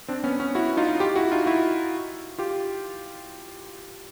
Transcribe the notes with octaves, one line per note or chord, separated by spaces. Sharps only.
C4 D4
B3 C#4
B3 C#4
E4 F#4
D#4 F4
F4 G4
E4 F#4
D#4 F4
E4 F#4
F4 G4